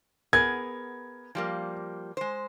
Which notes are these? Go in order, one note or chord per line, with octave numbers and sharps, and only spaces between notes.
B3 G#4 A#4 G#6
F3 G3 A#3
G#3 C5